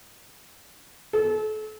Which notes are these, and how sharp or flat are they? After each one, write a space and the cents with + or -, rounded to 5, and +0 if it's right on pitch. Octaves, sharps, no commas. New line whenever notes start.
A4 -35